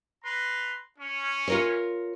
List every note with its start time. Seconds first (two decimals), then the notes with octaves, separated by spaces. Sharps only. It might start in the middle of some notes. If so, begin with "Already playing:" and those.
0.23 B4 A#5 C6
0.98 C#4
1.48 F4 A#4 C#5